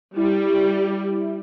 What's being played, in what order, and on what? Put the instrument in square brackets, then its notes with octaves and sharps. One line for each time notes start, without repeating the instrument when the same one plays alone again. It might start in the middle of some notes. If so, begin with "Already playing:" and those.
[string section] G3 [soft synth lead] E4